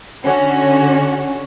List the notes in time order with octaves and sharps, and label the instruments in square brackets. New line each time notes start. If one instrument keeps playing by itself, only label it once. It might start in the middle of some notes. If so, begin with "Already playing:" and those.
[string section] D3 C#4 F#4